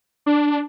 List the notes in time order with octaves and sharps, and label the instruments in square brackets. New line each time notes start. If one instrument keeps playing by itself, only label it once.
[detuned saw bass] D4